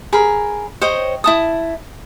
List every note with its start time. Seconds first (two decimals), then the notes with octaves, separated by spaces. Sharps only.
0.13 G#4 A#4 B5
0.81 C5 C#5 D#5 G5
1.24 E4 A5 D#6